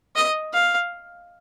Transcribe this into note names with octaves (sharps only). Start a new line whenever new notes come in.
D#5
F5